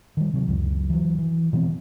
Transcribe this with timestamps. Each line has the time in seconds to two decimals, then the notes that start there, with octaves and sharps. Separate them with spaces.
0.17 D#3 G3
0.34 C3 F#3
0.48 C#2 F#2
0.90 E3 F#3
1.19 E3
1.53 B2 E3 B3 C4